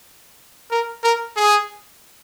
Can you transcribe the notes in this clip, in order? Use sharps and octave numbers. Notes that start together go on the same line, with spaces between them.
A#4
A#4
G#4